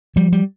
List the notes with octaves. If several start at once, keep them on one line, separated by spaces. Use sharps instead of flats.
F3 G3
G3